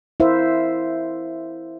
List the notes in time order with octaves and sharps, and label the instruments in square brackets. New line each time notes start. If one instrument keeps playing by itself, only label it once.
[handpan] E4 A#4 C5 E5 F5